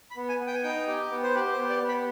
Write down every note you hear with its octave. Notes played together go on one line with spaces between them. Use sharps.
B5
B3
G#5
B3
G5
G#5
D#4 G5
G4
B3
C5
G4 B4
C5
B3
D5
B3
B5